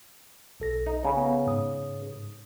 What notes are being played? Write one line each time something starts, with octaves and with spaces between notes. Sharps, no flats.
B1 A4 A#6
D#4
C#3 A#5
B3
G#2 D#6